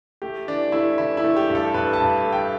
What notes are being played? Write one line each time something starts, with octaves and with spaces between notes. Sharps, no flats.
A3 G4
E3 D4
A3 E4
E3 E4
E4
A3
G4
G2
A4
G2 B4
A5
G2
A3
G5